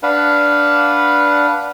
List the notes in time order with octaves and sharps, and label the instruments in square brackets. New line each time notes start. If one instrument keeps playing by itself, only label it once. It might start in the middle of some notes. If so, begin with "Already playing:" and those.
[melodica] D4 B4 F5 F#5